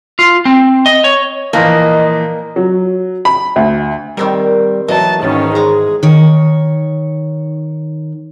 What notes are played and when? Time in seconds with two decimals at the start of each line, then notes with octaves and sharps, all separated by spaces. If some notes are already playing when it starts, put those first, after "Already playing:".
0.19 F4
0.45 C4
0.86 D#5
1.04 C#5
1.53 A#2 E3 F3 A#3 D#5
2.56 F#3
3.25 B5
3.56 D2
4.17 D#3 G3 C4 A#4
4.88 B2 E3 F#3 D#5 A5
5.23 G#2 D#3 C#4
5.55 G#3 G#4 A#5
6.03 D#3 C#5